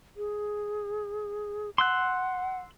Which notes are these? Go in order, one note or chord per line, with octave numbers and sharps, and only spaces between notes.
G#4
F#5 C6 E6 F#6